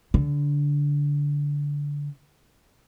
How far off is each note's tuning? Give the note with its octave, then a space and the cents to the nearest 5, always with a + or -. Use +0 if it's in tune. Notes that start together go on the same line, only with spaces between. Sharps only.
D3 -20